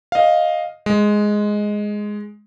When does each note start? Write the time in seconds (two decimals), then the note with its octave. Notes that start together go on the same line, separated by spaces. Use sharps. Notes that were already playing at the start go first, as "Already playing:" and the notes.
0.12 D#5 F5
0.86 G#3